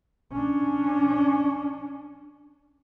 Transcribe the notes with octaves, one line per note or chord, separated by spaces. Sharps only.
C#4 D4